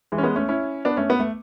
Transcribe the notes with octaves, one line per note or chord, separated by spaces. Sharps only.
E3 G#3
C#4
G#3 B3
A3 C#4
C#4 E4
B3 D4
A3 C#4
B3
A3